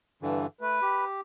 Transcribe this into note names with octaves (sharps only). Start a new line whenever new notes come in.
G2 D3 E3
A3 B4
G4